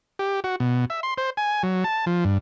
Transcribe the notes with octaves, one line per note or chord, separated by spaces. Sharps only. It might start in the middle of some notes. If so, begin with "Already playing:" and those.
G4
F#4
B2
E5
C6
C5
G#5
F#3
A5
F3
G2